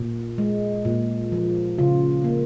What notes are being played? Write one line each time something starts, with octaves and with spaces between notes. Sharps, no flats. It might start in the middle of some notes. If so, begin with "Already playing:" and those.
Already playing: A#2
G#3
A#2
F3
C#3 F4
A#3